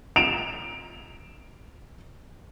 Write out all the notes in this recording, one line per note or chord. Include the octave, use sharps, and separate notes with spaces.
D7 E7 F7